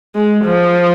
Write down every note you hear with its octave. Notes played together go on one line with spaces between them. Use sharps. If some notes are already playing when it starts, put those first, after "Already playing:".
G#3
F3